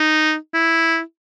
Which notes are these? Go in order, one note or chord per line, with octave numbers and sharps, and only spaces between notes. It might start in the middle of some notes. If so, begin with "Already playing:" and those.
Already playing: D#4
E4